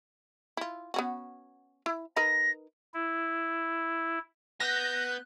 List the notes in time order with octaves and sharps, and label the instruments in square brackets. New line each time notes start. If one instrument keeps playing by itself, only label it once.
[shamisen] E4 F4
B3 C#4 F#4
E4
[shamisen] D#4 A#4 B4 [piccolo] A#6
[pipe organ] E4
[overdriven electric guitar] B3 [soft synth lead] F#6 [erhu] G6 [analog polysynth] A#6